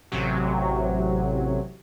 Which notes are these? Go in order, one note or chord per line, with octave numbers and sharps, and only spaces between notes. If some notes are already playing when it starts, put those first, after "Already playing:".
A1 C3 F#3